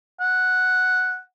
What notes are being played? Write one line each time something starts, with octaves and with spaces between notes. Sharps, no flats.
F#5